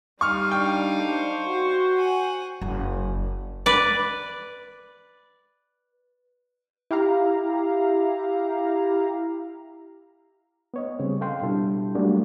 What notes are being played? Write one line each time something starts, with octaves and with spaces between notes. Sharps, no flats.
G3 D#4 F5 C#6 F6
D4 G5
C5 C#6
F#4
F#5 G#5
F#1
B4 D5
E4 G4 F5 A#5
B3 C#5 D#5
C#3 G3 C4
A4 F5 G5 C6
B2 G3 D4 E4 A4
F#3 G3 A3 A#3 C#4 D4